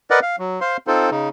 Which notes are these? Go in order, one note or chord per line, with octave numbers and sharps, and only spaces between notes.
A#4 B4 D5 D#5 F#5
F5
F#3
C5 F5 C6
C4 D#4 F4 A4 C5
C#3 D#4